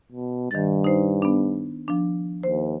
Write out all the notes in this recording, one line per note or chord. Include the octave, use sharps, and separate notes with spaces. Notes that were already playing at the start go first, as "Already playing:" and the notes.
B2
G2 D#3 A6
D#4 C5
B3 D4
F3 D4
D#2 C5